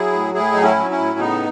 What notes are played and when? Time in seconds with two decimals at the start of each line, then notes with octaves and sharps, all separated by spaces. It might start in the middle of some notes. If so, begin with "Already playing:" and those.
Already playing: F#3 E4 G#4
0.12 A2
0.34 A2 E4 G#4
0.52 F#3 D#4
0.62 C#4 E4
0.76 F#3
0.90 C#4 E4
0.98 A2
1.19 C#3 B3 D#4